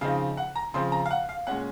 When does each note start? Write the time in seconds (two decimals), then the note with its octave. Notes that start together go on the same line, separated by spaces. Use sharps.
0.01 C#3 F3 C4 D#4 F5
0.37 F#5
0.56 A#5
0.74 C#3 F3 C4 C6
0.92 A#5
1.06 F5
1.11 F#5
1.29 F5
1.47 A#2 G#3 C#4 F#5